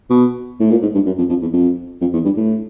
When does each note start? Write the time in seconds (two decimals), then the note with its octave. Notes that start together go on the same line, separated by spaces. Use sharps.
0.10 B2
0.60 A2
0.71 A#2
0.82 G#2
0.95 G2
1.06 F#2
1.18 F2
1.29 F2
1.42 E2
1.53 F2
2.01 F2
2.13 E2
2.25 G2
2.37 A2